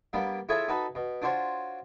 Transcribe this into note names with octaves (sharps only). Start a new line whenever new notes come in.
G3 A#3 B3 D4
E4 F4 G#4 A4 C#5 E5
D#4 F#4 A4 B4
B2
D4 F4 F#4 C5 C#5